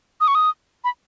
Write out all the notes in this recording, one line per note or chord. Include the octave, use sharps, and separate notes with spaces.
D#6
C#6
D#6
B5